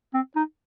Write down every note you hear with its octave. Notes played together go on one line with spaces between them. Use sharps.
C4
D#4